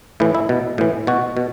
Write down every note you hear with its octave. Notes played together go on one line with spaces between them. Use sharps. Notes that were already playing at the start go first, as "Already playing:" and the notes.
A2 E3 E4
E4
B2
A2 E3
B2 F#4
B2